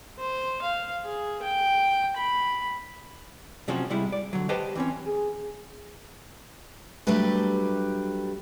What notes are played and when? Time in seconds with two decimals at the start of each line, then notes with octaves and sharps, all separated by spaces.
0.19 C5
0.62 F5
1.05 G#4
1.42 G5
2.17 B5
3.68 C3 F3 F#3 C#4 F#4
3.90 C3 G3 G#3 E4
4.12 D5
4.33 D3 F#3
4.49 G4 B4 C5 D#5 G5 A5
4.75 E3 C4 C#4
5.06 G#4
7.07 F#3 G3 A3 D4 G4 B4